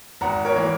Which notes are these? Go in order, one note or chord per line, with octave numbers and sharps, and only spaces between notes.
G#1 F#5 A#5
A#4 C#5
E3 A#3